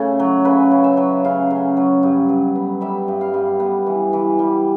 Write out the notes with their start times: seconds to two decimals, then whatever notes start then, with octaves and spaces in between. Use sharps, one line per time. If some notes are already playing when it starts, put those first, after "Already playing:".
Already playing: C#3 A3
0.20 F#3
0.45 C#3 B4
0.71 C#3
0.84 E5
0.97 F#3
1.25 C#3 F5
1.51 C#3
1.77 F#3
2.03 G2
2.29 G2
2.56 B3
2.81 G3 E5
3.08 G2
3.21 F5
3.34 G2
3.60 B3
3.86 E3
4.13 E3
4.39 G3